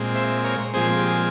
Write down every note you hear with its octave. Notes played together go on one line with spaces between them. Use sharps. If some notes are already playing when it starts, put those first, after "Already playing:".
Already playing: A#2 G#3 C4
C5 E5
A#4 C#5
A#2 F3 G#3 C4 G#4 C5
G4
G#4